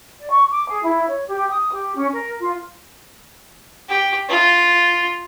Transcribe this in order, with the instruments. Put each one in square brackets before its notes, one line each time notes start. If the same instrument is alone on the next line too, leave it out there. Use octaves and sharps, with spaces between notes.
[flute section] D5
C#6
D6
G#4
E4
C#5
G4
D#6
G4
C#4
A#4
F4
[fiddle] G4
F4